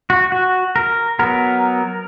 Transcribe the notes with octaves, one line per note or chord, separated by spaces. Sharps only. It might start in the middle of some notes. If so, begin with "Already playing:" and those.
F#4
F#4
A#4
F#3 B3 A#4